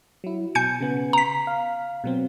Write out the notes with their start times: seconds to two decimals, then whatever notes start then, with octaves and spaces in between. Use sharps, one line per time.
0.24 F#3 E4
0.55 B2 G#5 G6 C#7
0.81 C#3 B3
1.13 A#5 B6
1.47 F5
2.04 B2 F#3 C4